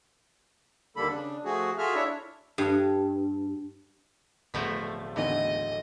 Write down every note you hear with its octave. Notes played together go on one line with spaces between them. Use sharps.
D#2 D3 G3 A#3 A4 B5
C#3 D4
F3 A3 F#4 G#4
F4 F#4 G#4 A4 E5 F6
D4 E4 C#5 E5
G2
D1 B2 F3 A3
G#1 E2 A2 D3 D#5